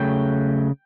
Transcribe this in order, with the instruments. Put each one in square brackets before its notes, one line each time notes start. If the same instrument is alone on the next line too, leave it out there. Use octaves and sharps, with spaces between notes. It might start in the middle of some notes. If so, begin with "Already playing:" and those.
Already playing: [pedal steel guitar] C#3 F#3 A3 G5